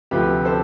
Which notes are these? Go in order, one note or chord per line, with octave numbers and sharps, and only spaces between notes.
D2 C3 F3 A3 G4 B4
A4 C5